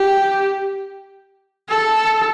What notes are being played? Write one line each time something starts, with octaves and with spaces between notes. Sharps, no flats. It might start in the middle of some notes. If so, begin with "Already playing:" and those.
Already playing: G4
A4